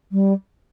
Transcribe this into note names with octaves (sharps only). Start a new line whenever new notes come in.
G3